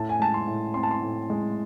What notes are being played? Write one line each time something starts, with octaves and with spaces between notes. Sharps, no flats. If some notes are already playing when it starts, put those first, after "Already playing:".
Already playing: A2 A5
G#5
G#3 A5
C6
A2
C4 C6
A5
C6
A2
G#3